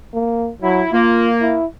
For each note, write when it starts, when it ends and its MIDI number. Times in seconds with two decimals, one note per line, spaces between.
0.14 0.51 58
0.62 0.82 54
0.62 0.91 64
0.92 1.55 58
0.92 1.28 65
1.41 1.65 64